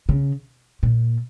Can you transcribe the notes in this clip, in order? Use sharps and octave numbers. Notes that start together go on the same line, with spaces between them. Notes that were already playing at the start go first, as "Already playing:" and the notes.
C#3
A#2